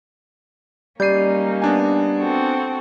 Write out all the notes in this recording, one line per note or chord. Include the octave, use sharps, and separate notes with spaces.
G3 A#3 C#4 D#4 D5 G6 C7 D#7
B3 D4 G#5
C4 F#4 A4